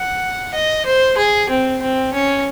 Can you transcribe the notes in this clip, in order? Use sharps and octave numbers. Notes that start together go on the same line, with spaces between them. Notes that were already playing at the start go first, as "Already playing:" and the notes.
Already playing: F#5
D#5
C5
G#4
C4
C4
C#4